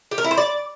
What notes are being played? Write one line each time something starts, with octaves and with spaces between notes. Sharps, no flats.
G4
A#4
E4
C5
D5